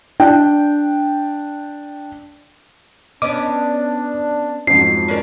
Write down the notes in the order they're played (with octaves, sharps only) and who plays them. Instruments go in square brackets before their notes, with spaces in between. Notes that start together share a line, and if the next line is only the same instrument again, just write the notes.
[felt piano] D4 G5
[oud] B3 C#4 D#5 [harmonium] D4 [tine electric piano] D6
[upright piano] F2 G#2 F#3 [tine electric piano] C7
[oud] C#4 D4 A#4